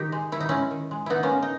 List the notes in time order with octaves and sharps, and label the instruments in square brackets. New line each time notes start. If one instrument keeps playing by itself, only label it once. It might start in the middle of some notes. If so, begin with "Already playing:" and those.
Already playing: [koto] D#3 B3 D#4 G4
G#3
D#3 E4
D#4
G#3 C#4 E4
D#3
G#3
D#3 B3 D#4 E4
A#3 C#4
G#3
D#4